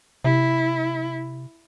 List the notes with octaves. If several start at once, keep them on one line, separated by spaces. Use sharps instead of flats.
C3 E4